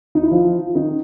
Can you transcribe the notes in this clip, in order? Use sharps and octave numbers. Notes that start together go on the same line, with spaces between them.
D#4
E4
F3 F4
D#3 D#4